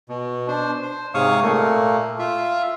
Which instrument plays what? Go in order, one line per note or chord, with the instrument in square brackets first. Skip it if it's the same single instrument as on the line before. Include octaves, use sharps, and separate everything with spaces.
[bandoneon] B2
D4 C5
C5
G#2 C3 C#5 F5 C#6 D#6
A#2 A3 A#3
F4 E5